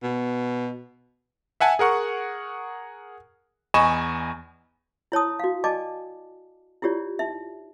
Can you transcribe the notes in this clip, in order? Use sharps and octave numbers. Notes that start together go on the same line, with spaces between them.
B2
E5 F#5 G#5 A5
G#4 A#4 F#5 C#6
E2 D#5 G#5 B5 C#6 E7
E4 C#5 A5 D#6
F#4 F5
D5 D#5 G#5 A5 D6
E4 F4 G4 C#5 D5
D#4 E5